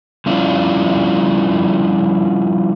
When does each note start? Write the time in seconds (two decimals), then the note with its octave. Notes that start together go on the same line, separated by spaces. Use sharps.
0.26 F3 G3 C#4 D4 E4 F4